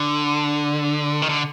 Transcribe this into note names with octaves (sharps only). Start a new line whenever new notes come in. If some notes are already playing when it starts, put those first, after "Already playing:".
Already playing: D3
D#3
D3